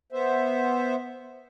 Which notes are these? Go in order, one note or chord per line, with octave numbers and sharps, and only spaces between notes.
B3 C5 E5